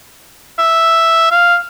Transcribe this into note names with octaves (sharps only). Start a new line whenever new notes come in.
E5
F5